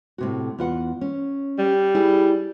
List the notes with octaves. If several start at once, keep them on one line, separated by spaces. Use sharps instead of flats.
A2 C3 F#4
E2 F4 F#5
C#4
G3
E4 G#4 G#5